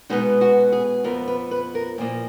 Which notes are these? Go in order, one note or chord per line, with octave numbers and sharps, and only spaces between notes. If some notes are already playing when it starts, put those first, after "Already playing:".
B2 G#3 B3 D#4
F#4
G#4
F2 F3 B3 A#4
B4
B4
A#4
A#2 F3 A#3